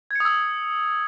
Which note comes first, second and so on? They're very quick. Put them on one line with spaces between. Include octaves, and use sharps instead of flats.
G#6 C#7 D#6 E6